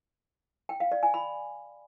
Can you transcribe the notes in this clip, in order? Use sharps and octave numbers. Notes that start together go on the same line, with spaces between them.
G5
F5
D5
G#5
B5